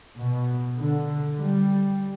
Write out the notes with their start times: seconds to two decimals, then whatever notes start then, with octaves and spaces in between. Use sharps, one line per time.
0.18 B2
0.78 D3
1.40 G3